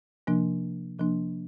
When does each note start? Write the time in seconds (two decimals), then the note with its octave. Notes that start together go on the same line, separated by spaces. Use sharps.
0.27 C3 F3 A#3 D4
0.98 C3 F3 A#3 D4